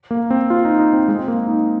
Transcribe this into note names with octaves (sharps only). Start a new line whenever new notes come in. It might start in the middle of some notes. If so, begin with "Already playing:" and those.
A#3
C4
F4
D#4
D#4
C4
G#3
C4
A#3
D#4